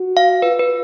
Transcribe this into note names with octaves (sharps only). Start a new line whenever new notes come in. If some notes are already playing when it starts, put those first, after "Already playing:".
Already playing: F#4
F5
F4 B4
B4